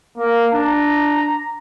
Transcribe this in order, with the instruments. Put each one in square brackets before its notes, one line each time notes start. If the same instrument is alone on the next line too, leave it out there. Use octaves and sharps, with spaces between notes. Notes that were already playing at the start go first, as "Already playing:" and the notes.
[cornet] A#3
[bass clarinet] D4 [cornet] A#5